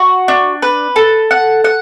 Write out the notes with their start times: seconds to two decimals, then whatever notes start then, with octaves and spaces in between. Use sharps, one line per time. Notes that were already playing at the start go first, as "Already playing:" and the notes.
Already playing: F#4
0.28 D4
0.62 B4
0.96 A4
1.31 F#5
1.64 F#5